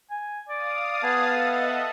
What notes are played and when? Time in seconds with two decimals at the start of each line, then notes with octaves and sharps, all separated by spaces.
0.10 G#5
0.49 D5 F5 D#6
1.03 B3 G#4 A5
1.36 A4 D#5 E5 F#5